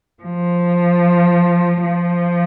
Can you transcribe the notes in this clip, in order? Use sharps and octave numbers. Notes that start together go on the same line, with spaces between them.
F3
F3